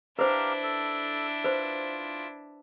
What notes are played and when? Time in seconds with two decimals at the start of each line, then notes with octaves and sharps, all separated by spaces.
0.19 D4 E4 G4 B4 C5 F5 A#5
0.63 A4
1.44 F4 B4 C5